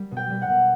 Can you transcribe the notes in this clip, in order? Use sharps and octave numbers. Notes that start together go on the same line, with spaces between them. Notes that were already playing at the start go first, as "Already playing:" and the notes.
Already playing: G3
B2
G5
G3
F#5
B2